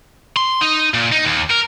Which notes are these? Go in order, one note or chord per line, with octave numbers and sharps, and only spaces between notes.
C6
D#4
A#2
D#4
D#2
A#4